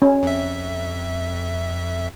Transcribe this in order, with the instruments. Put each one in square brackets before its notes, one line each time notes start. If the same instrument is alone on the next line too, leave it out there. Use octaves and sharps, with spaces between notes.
[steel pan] C#4
[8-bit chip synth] F2 E5